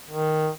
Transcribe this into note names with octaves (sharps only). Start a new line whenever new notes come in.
D#3